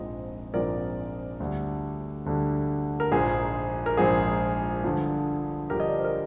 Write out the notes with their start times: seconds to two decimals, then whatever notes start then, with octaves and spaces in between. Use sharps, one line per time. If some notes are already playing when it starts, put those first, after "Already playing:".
Already playing: A#1 G#2 F3 G#3 C4 C5 D#5
0.54 A#1 G#2 F3 G#3 C4 A#4 D5
1.40 D2 D3 G3
2.26 D2 D3 G3
3.00 A#4
3.11 A#1 G#2 F3 G#3 G#4 C5
3.86 A#4
3.97 A#1 G#2 F3 G#3 G#4 C5
4.84 G2 D3 F3
5.70 G2 D3 F3 G4 A#4
5.80 D#5
5.88 D5
5.96 C5
6.04 A#4